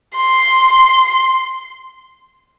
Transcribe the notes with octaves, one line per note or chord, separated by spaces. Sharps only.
C6